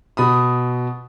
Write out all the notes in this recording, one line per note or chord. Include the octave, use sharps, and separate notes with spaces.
B2 B5 D#6